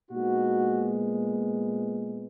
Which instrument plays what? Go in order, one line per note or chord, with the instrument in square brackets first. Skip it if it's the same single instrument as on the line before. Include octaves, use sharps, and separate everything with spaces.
[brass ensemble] A#2 G#3 B3 D#4 F#4